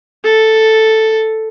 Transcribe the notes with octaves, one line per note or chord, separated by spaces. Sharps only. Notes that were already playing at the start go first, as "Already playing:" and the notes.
A4